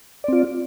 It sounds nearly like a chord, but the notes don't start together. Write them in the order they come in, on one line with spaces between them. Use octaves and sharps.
D5 C4 F4